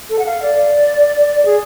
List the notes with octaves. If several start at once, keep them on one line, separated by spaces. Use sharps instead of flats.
A4
F#5
F5
D5
G#4